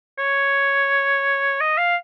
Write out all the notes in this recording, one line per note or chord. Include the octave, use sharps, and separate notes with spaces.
C#5
D#5
F5